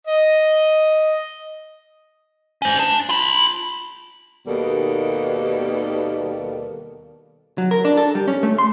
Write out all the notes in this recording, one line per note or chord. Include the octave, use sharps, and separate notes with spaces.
D#5
C#4 C5
D4
F4 B5
D#2 B2 D#3 G3 A#3 A4
F#3
A#4
D4
A4
G3
C#4
A3
C6